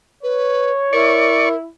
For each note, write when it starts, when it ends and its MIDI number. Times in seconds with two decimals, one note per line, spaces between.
0.23 0.71 71
0.23 1.30 73
0.93 1.67 64
0.93 1.56 70
0.93 1.49 74
0.93 1.49 85